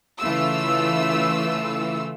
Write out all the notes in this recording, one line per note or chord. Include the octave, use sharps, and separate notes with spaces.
C#3 E3 A3 F4 E6